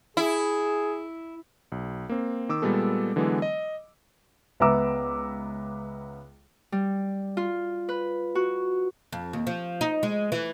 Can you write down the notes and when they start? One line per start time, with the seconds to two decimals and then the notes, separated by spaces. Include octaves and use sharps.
0.17 E4 G#4
1.72 B1
2.09 A#3 C4
2.49 D#3 D6 E6
2.62 A#2 G3 G#3 B3 A4
3.16 D3 E3 F#3 G#3 B3
3.42 D#5
4.60 C#2 B3 E5 A#5 D6 E6
6.72 G3
7.37 F4
7.89 B4
8.35 F#4
9.13 F2
9.33 D#2
9.47 F3
9.81 D#4
10.03 G#3
10.32 E3